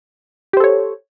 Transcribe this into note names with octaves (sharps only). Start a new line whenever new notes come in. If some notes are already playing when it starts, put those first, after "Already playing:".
G4 A4 C5 C#5